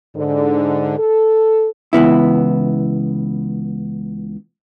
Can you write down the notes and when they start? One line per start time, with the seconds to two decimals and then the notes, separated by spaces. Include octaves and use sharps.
0.16 G#2 D3
0.98 A4
1.93 C#2 E3 B3 E4